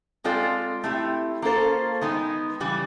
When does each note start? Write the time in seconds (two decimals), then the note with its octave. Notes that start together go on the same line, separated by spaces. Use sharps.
0.24 G#3 C4 F4 A4 D5
0.84 A3 C4 E4 G4
1.42 A#3 C#4 F4 A4 C5
2.01 D#3 G#3 B3 D#4
2.60 C#3 E3 G3